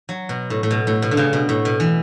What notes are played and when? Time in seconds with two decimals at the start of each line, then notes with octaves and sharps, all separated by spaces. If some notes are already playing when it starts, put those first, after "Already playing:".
0.09 F#3
0.29 B2
0.50 A2
0.63 A2
0.71 B2
0.87 A2
1.02 B2
1.11 D3
1.17 C#3
1.33 B2
1.49 A2
1.65 B2
1.80 E3